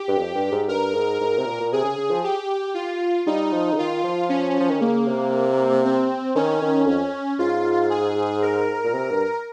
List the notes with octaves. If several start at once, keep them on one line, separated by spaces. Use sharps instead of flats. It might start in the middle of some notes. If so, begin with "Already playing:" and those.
Already playing: G4
G2
F2
G2
G#2
G2 A#4
G#2
G#2
C3
A#2
A#2
C3 G#4
C#3
C#3
F3
G4
F4
G3 D#4
F3
C#3
D#3 F4
F3
C#4
F3
D#3
C#3 A#3
C3
C4
D#3 C#4
D#3
F2 C#4
G#2 F4
G#4
A#4
A#2
C3
G2